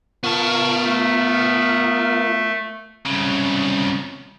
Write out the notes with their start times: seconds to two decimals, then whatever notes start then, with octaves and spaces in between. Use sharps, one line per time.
0.24 B3 F4 A#4 F5 A5 C#6
0.84 A3
3.05 C2 C#3